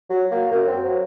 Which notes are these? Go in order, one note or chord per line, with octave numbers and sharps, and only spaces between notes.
F#3
A#3
F#2
C4
F#3